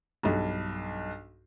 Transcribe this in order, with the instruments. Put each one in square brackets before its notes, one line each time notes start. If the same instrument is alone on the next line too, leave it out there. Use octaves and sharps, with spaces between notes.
[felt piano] B1 G2